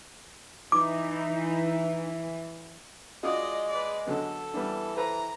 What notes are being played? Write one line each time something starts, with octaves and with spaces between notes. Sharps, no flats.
E3 D#4 D6
G#3 F4 F#4 D5 D#5 D#6
B4 D5
D3 F#3 B3 A4
E3 G3 B3 D4
A4 B4 C5 A#5